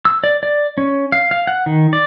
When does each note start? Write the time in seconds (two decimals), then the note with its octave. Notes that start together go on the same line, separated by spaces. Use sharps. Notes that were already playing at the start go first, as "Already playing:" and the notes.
0.05 E6
0.24 D5
0.43 D5
0.78 C#4
1.12 F5
1.31 F5
1.47 F#5
1.66 D#3
1.93 D5